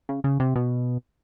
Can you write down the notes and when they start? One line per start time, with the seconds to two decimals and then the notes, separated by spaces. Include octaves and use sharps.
0.09 C#3
0.24 C#3
0.40 C3
0.56 B2